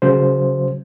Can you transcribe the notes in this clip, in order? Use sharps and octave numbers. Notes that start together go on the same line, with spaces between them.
C#3 F#3 C5